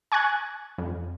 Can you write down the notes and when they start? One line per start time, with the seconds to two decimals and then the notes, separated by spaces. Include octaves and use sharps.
0.12 G#5 C#6 F#6 G#6
0.78 F2